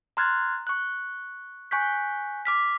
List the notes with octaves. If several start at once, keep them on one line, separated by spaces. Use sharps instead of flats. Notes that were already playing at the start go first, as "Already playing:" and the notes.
A#5 C6 F6 F#6 G#6 A6
C#6 F#6
G#5 C#6 F#6 G6 B6
D6 F6 B6